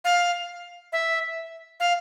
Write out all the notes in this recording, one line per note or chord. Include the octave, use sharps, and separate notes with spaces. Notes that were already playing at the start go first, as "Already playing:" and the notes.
F5
E5
F5